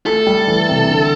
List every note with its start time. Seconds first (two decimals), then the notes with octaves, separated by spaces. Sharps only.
0.06 A3 A4
0.27 G3
0.48 E3
0.69 C3
0.89 D3